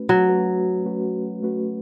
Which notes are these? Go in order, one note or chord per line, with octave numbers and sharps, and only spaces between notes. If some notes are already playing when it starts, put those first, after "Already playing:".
Already playing: A3 C#4 F#4 B4
F#3
A3 C#4 F#4 B4
A3 C#4 F#4 B4
A3 C#4 F#4 B4